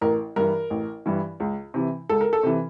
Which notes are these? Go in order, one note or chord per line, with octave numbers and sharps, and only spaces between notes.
A1 A#4
G2 E3 A#4
A1
G2 E3
C#2
C3 E3
C#2 A4
A#4
A4
C3 E3